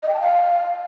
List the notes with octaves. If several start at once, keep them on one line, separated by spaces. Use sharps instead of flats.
D#5
G5
A5
F5